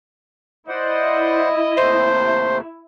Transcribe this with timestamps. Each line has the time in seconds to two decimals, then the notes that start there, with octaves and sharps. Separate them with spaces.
0.68 E4 C5 D5 D#5 F#5
1.77 D#2 C3 A3 C5